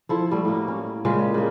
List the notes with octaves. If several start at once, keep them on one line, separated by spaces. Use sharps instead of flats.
F3 E4 A4
G3 A3 F#4
A2 A#3
C#4
A#2 C#3 G#3 G4
C#3 A#3